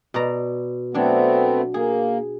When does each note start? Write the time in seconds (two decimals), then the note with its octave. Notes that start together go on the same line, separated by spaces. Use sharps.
0.14 B2 D5 A#5
0.94 F#3 A3 B3 C4 D4
1.74 A#3 G#4